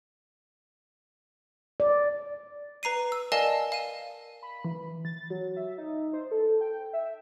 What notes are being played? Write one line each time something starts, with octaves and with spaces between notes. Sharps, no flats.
D5
B4 A#5 C7 D#7
E6
A#4 D5 D#5 F5 G#5 A5
F5 D#7
B5
E3
A6
F#3
E5
D#4
C5
A4
G5
E5